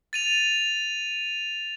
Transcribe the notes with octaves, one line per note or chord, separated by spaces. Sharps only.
A6 D#7 F7